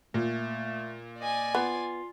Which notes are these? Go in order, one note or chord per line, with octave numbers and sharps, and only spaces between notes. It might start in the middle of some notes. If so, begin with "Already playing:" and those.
A#2 A3
D5 D#5 G#5
B3 F4